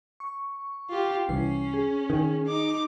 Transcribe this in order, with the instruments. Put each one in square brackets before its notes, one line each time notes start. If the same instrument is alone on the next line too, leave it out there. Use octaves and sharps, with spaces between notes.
[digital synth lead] C#6
[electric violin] F4 G4
[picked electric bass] C2 E3 [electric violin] C#4 [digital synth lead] C7
[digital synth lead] G#4
[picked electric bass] D#3 [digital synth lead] G#4
[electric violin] D#4 D6